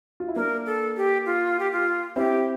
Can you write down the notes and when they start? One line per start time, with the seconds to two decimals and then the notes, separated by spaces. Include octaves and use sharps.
0.20 F4
0.28 E4
0.36 A#3 D4 A#4
0.66 A4
0.97 G4
1.26 F4
1.59 G4
1.72 F4
2.16 C4 E4 G4